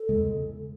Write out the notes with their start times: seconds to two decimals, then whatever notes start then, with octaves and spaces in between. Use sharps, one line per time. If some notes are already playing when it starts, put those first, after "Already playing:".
Already playing: A4
0.09 E2 C#3 G#3